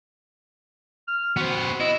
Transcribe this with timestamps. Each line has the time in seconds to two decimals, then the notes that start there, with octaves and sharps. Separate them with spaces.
1.08 F6
1.37 B3 F#4 C5
1.80 E4 D#5